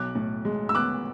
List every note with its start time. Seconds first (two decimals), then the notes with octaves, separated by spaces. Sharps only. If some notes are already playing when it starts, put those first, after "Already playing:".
Already playing: B1 D6 F#6
0.15 A2
0.45 G#3
0.69 E6
0.75 B3 D6 F#6